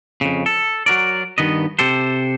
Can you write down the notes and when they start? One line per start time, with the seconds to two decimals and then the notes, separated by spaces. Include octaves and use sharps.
0.21 F2 C#3
0.46 A4
0.86 F#3 F#4 A#4 D5
1.38 G2 D#3 B3 D#5
1.79 C3 G4 A4 C5